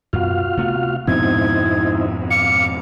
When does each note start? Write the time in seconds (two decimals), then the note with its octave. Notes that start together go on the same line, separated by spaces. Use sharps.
0.13 F#2 B2 F4 F#4 F5
0.57 C3 A3 B3
1.08 F2 G#2 B2 C4 D#4 E4 G#6
2.30 F5 D6 C#7